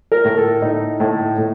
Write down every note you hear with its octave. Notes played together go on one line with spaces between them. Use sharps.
A#4
A2
A4
A2 D#4
A2
A2